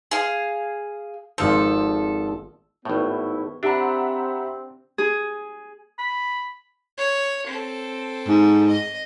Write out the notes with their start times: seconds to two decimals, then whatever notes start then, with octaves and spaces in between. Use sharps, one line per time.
0.11 G#4 F5
1.38 G#1 F3 A4 C5
2.85 G#1 A2 B3 E4 C#6
3.63 C4 D4 G4 E5 F#5 A#5 B5
4.98 G#4
5.99 B5
6.98 C#5
7.47 C4 A4
8.28 G#2
8.68 D#5